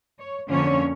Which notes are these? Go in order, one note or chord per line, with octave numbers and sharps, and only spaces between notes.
C#5
F2 D3 F3 A#3 C#4 C#5